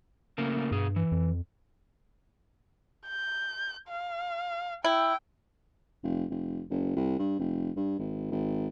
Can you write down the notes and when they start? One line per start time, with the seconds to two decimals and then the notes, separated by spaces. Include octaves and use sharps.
0.38 C#3 A3 A#3
0.72 G2 B2 G#4
0.96 E3
1.12 F2
3.07 G6
3.88 F5
4.85 E4 G5
6.03 F1
6.30 F1
6.70 F#1
6.96 C2
7.19 G2
7.39 F1
7.77 G2
7.99 G#1
8.31 G#1